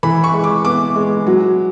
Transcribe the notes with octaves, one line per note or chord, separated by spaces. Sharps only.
E3 B5
C#6
G#3
D6
B3 D6
G#3
F#3